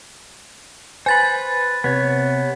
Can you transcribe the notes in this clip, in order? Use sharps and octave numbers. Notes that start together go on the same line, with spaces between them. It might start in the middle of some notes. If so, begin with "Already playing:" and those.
B4 C5 G#5 B5 A6
C3 B3 C#5